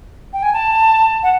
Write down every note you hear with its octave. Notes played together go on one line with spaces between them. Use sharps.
G5
G#5
A5
F#5